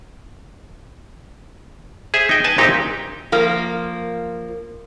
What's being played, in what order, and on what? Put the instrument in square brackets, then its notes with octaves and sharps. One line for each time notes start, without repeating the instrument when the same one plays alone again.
[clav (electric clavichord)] G#4 C5 E5
D#4 G5
B4 G#5 A5
A#1 A#2 D#4 E4 G4 G5
[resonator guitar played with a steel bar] F3 A#3